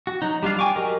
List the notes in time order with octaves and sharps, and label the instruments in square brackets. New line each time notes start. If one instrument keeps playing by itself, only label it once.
[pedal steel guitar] F#4
F#3 D#4
G3 D4 F4 F5
G5 G#5 C#6 D6
F#3 G4 G#4 A#4 D#5